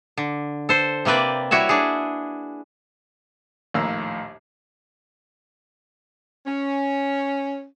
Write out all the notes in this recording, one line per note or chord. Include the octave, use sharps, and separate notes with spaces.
D3
A4 C5
C3 A#3 C4 B4 D5
G3 E4 F#4 C#5 E5
D4 G#4
A#1 D#2 A2 F5 A#5 E6
C#4